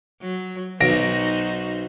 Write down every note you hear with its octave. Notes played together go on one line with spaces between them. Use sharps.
F#3
B1 D#4 F#4 C5 A#6 D7